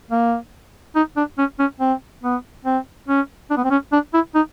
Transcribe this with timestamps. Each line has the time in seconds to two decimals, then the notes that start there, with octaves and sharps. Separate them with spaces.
0.11 A#3
0.95 D#4
1.17 D4
1.38 C#4
1.59 C#4
1.80 C4
2.23 B3
2.65 C4
3.08 C#4
3.50 D4
3.57 B3
3.64 C4
3.71 C#4
3.92 D4
4.14 E4
4.35 D#4